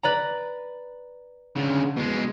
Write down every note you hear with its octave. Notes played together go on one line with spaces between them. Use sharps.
B4 D5 A#5
D2 C#3
B2 G#3